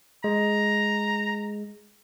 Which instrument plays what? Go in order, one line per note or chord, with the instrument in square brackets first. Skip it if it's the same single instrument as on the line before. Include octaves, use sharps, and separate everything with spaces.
[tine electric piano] G#3 [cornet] A#5